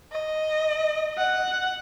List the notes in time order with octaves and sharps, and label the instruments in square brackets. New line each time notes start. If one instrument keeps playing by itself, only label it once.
[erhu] D#5
[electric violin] F#5